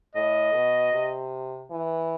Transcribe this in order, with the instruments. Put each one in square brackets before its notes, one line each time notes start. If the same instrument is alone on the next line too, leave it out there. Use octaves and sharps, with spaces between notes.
[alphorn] A2 [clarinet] D#5
[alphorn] B2
C3
E3